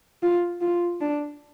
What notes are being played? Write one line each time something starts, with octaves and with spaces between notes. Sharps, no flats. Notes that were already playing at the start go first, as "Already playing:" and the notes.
F4
F4
D4